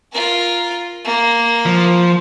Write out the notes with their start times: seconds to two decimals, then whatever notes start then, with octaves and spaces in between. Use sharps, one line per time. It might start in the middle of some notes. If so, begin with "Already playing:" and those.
0.12 F4 A#4
1.04 A#3
1.66 F3